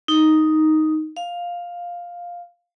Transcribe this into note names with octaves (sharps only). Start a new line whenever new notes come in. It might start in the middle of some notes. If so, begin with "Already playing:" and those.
D#4
F5